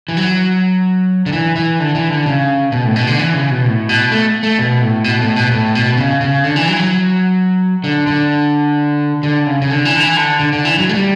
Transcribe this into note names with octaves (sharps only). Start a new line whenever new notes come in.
E3
F#3
D3
E3
E3
D3
E3
D3
C#3
B2
A2
B2
D3
E3
C#3
B2
A2
B2
A3
A3
B2
A2
B2
A2
B2
A2
B2
C#3
C#3
D3
E3
F#3
E3
F#3
D3
D3
D3
C#3
C#3
D3
E3
D3
E3
D3
D3
D3
E3
F#3
A3
G3